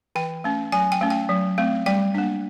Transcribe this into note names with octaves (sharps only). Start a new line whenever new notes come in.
E3 G5
A3 C#4
F#3 G#5
G5
A3 C#4
G5
F#3
A3 C4
G3 G5
A#3 D4